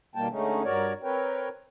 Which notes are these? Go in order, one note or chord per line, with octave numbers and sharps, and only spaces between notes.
B2 D#3 G3 A#3 G5 A5
D3 G#3 A3 C#4 D#4
G2 F#4 A#4 C#5 D5
C4 A#4 B4 C#5 G5